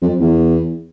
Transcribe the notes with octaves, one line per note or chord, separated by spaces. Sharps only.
F2
E2